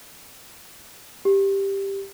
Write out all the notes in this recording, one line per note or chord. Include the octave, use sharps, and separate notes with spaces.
G4